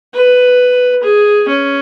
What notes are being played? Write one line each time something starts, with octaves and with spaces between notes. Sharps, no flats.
B4
G#4
C#4